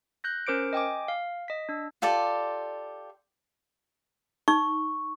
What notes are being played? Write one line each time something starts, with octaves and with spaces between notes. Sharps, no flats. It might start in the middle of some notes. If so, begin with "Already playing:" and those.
F#6 G6 A#6
C#4 A#4 C5 D6 C#7 D7
D#5 G5 G#5 D6
F5
D#5 B6
D4 E6
F4 G4 A4 D5
D#4 C#6